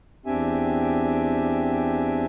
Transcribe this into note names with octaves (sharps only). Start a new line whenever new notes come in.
E2 C4 D4 G4 E5 G#5